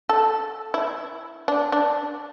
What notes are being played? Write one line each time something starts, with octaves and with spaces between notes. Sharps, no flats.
A4
E4
D4
D4